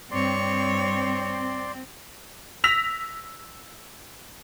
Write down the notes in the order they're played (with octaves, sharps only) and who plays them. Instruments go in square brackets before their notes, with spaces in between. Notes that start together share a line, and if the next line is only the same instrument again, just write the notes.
[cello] G2 C#5 [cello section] C4 [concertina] D5 C6
[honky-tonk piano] E6 A#6 B6 F7